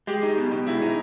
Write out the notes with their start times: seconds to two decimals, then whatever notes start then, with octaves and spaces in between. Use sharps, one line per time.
0.07 G#3 G4
0.23 D#4
0.38 B2
0.52 B2
0.67 G#3 E4
0.82 D#4